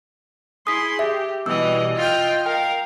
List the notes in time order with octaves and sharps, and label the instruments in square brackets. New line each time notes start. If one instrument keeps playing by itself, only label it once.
[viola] E4 C6 [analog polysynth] G#4 [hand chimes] D#6 B6
[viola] G4 [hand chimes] E5
[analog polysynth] B2 G3 [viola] E3 D#5 [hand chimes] E6
[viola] F4 G5 [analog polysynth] D#5 F6
[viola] A#4 F5 [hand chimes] G5